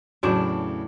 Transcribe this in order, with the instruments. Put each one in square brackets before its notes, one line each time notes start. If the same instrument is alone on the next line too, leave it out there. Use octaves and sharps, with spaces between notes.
[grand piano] E2 C#3 [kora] A2 D4 E4 [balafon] F#3 F#4